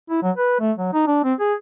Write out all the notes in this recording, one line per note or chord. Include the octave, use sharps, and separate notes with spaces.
E4
F#3
B4
A3
F#3
D#4
D4
C4
G#4